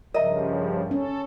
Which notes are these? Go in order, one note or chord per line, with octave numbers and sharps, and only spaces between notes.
G2 C#3 F3 A#4 D#5 E5 A#5
C#4 A4